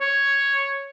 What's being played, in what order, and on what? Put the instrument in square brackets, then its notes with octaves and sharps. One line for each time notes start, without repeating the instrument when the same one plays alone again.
[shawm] C#5